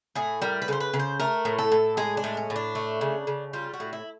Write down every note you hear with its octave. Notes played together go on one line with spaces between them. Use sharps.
A2 G#4
G3 A#4
B4
C#3 C5
B4
C#3
C5
A3 A#4
A2
A4
A2
G#3 G#4
D4
A2
C#4
A2
D4
A3
C#3
C#3
G3 F4
F#4
A2
E4